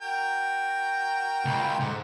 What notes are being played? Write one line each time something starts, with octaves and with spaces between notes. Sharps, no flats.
F#4 A#4 G5
C#2
G#2 A4 F#5